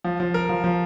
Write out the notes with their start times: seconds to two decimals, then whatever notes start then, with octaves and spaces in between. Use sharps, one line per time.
0.04 F3
0.20 F3
0.34 A#4
0.49 F3
0.64 F3